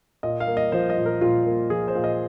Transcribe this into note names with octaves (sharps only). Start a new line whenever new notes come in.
A#2 D#5
F5
A#3
D#5
F3 C5
D#5
A#2
A#4
A#2 F4
A#3
F3 G#4
C5
A#2
D#5